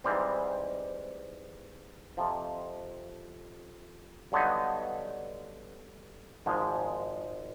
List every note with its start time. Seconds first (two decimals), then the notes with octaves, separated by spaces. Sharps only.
0.04 G#2 E3 G3 C4
2.17 F2 C3 F3
4.32 G2 D3 F#3 B3 D#4
6.46 G#1 G#2 F3 G#3